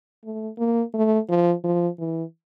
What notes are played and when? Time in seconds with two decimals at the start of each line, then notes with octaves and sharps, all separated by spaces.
0.24 A3
0.58 A#3
0.94 A3
1.29 F3
1.64 F3
1.99 E3